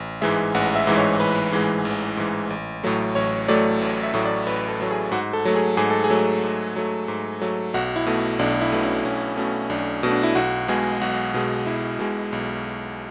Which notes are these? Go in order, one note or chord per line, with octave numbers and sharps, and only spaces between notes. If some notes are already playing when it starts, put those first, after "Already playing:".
Already playing: A1
G#2 E3 G#3 E5
A1 F#5
E5
G#2 E3 G#3
C#5
A1 B4
G#2 E3 G#3
A1
G#2 E3 G#3
A1
A2 F#3 A3
A1 C#5
A2 F#3 A3 D5
A1
E5
A2 F#3 A3
D5
A1 B4
A4
A2 F#3 A3
G#4
G#2 F#4
A4
F#3 A3
G#4
G#2 G#4
A4
G#4
F#3 A3
G#2
F#3 A3
G#2
F#3 A3
B1 F#4
E4
B2 A3
B1 D4
E4
B2 A3
C#4
B1 C#4
B2 A3 C#4
B1 D4
B2 A3
D4
E4
B1 F#4
B2 G#3 G#4
B1 F#4
B2 G#3
B1 E4
B2 G#3
B1